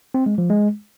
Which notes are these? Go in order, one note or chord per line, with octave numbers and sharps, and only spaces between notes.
C4
G#3
F3
G#3